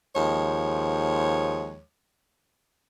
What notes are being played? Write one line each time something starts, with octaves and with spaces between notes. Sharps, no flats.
D#2 F3 G#3 C#5